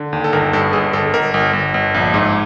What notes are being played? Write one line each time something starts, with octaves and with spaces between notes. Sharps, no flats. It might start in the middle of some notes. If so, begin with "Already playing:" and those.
Already playing: D3
D#2
A4
G1 A#4
G2 A4
G1 G#4
G1 A4
G1 A#4
G1
G1
G1
A#1
G#2